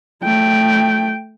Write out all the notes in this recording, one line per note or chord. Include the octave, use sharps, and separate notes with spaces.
A3 G5